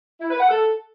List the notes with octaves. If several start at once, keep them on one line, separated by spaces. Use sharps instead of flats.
E4
B4
F#5
A4